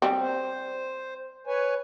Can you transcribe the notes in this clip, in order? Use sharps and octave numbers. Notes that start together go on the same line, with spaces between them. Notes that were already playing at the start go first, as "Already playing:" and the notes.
G3 C4
C5
B4 C#5 G#5